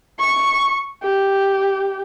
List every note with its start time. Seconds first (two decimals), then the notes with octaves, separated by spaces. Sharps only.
0.19 C#6
1.03 G4